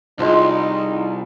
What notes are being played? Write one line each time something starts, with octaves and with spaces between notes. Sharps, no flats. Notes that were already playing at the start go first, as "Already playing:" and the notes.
C2 F3 G#3 D#4 F4